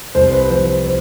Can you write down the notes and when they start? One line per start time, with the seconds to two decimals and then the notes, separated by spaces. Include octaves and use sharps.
0.15 C2 C5
0.32 B4
0.50 F3 C5
0.85 C5